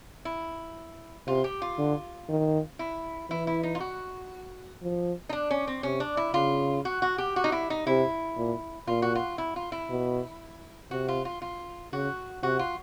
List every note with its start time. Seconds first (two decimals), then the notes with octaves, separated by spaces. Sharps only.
0.25 E4
1.27 C3 F4
1.44 G4
1.62 F4
1.78 D3
2.29 D#3
2.79 E4
3.30 E3 E4
3.47 E4
3.63 D#4
3.75 F4
3.80 F#4
4.82 F3
5.29 D#4
5.33 D4
5.51 C#4
5.67 C4
5.83 C3 C#4
6.00 D4
6.17 E4
6.34 C#3 F4
6.85 F#4
7.02 F#4
7.18 G4
7.36 F#4
7.44 D#4
7.52 E4
7.70 D#4
7.87 C3 E4
8.37 A#2
8.87 A#2 F4
9.02 F#4
9.15 F4
9.38 E4
9.56 F4
9.72 E4
9.90 B2
10.91 C3 F#4
11.08 F4
11.25 F4
11.42 F4
11.93 C#3 F#4
12.43 C3 F#4
12.59 F4